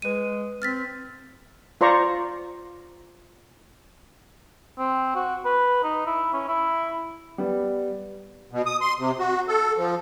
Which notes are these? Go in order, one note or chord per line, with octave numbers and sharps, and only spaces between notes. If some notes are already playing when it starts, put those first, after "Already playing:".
G#3 B4 D#7
C4 F6 A6 B6
F4 C5 D5 A#5 C#6
C4
F#4
B4
D#4
E4
C#4
E4
G3 B3
B2
D#6
C6
C3
F#4
A4
F3